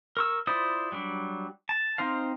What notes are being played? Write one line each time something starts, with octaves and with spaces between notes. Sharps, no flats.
A#4 C#6 E6
E4 F4 C5 D5 D#6
F#3 G3 D4
A5
C4 D#4 C5 F5